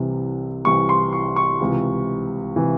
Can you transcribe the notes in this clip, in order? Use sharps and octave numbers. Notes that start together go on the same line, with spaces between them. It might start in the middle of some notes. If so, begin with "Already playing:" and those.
Already playing: C2 C3 E3
C2 C3 E3 C#6
C6
C#6
C#6
C#2 C3 E3
C3 E3